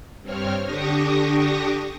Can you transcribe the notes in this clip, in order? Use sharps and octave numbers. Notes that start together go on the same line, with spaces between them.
G2 C4 C#5 F6
D3 D4 G4 C#6 D#6 A#6